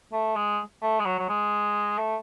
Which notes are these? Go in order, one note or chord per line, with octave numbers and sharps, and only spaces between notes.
A3
G#3
A3
G#3
F#3
F#3
G#3
A3